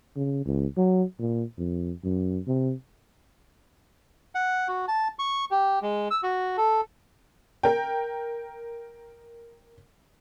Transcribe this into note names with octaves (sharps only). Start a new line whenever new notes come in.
C#3
C#2
F#3
A#2
F2
F#2
C3
F#5
F#4
A5
C#6
G4
G#3
E6
F#4
A4
A#4 G5